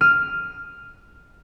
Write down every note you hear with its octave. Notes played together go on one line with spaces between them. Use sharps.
F6 D#7